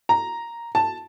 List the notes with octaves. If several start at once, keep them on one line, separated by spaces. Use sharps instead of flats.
A#5
A5